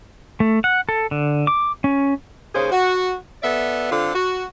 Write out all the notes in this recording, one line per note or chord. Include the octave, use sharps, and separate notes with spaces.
A3
F#5
A4
D3
D6
C#4
D#2 C#3 G#4 C5
F#4
B3 A4 D5 E5
D3 C4 F4 A4
F#4